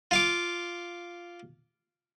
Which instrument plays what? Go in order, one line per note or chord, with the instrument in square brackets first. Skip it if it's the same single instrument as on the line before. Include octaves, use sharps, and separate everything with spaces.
[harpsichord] F4 F5 D6